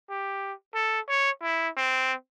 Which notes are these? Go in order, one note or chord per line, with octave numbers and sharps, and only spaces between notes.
G4
A4
C#5
E4
C4